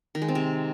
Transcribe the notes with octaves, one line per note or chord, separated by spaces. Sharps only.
D#3
G#3
C4
C3